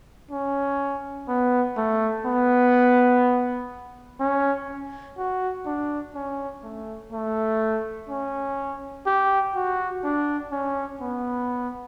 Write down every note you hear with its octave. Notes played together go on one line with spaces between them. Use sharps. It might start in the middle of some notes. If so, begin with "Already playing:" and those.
C#4
B3
A3
B3
C#4
F#4
D4
C#4
A3
A3
C#4
G4
F#4
D4
C#4
B3